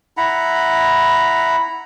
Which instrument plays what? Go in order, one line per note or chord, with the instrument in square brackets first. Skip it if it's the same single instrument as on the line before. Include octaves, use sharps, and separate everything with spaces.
[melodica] E4 F#5 A#5 B5